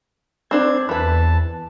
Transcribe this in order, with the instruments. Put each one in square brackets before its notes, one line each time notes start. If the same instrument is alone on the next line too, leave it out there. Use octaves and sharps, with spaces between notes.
[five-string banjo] C4 D4 C5 [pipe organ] G#6
[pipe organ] E2 A5 [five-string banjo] E3 B4